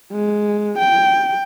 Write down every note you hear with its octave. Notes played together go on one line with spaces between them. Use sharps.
G#3
G5